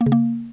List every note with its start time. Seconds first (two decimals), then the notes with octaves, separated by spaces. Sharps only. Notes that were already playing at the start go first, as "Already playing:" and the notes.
0.01 A#3
0.06 C#3
0.12 A#3